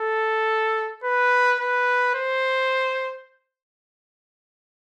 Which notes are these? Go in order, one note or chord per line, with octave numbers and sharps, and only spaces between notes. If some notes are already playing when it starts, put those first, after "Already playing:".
Already playing: A4
B4
B4
C5